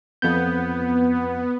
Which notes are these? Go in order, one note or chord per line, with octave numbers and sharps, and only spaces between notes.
F2 B3 G6